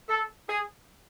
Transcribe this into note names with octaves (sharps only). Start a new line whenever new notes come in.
A4
G#4